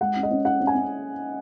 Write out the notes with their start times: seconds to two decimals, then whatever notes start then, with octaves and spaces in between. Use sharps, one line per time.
0.01 G#3 F#5
0.16 C#4
0.23 D#5
0.31 C#4
0.45 C#4 F#5
0.60 C#4
0.67 G#5
0.75 C#4